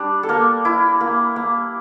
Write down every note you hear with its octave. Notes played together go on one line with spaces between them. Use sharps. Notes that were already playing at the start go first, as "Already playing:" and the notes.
Already playing: G3 D4
A4
A#3 A#4
E4
A#3
A#3